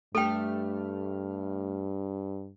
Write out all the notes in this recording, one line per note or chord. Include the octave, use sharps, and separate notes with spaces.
G2 A3 G4 A4 G5 F6